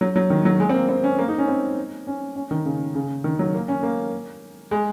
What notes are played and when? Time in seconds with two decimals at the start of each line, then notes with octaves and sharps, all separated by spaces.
0.01 F#3
0.16 F#3
0.30 D#3
0.45 F#3
0.60 G#3
0.69 C4
0.74 A#3
0.89 C4
1.04 C#4
1.19 A#3
1.28 D#4
1.38 C#4
1.48 C4
2.07 C#4
2.36 C#4
2.51 D#3
2.65 C#3
2.95 C#3
3.24 D#3
3.39 F#3
3.54 A#3
3.68 C#4
3.83 A#3
4.71 G#3